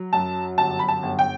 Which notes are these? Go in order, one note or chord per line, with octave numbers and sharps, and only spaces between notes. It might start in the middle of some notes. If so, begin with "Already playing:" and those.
Already playing: F#3
F#2 A5
G1 A5
B5
A5
G1
G5